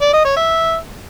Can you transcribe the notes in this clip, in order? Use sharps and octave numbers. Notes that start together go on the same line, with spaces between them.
D5
D#5
C#5
E5